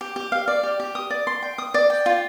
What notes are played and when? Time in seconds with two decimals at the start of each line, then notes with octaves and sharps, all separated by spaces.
0.01 G4
0.16 G4
0.32 F5
0.48 D5
0.63 G4
0.80 G4
0.95 D#6
1.10 D5
1.27 C6
1.42 G5
1.58 D#6
1.74 D5
1.90 G5
2.06 F4